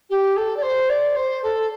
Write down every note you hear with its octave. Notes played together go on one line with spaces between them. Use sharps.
G4
A4
D5
C5
D5
C5
A4